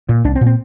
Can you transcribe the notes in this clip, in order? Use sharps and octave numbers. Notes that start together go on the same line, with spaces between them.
A#2
C2 D4
C4
A#2
C4